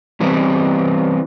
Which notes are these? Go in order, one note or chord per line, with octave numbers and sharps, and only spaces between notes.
E3 G3 B3 C4